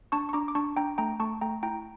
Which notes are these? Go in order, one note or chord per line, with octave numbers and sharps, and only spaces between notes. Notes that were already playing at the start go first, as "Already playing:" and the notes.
D4 A5 C#6
C#6
D4 A#5 D6
D6
D4 A5 C#6
D4 G5 A#5
A3 G5 A#5
A3 A5 C#6
A3 G5 A#5
E4 G5 A#5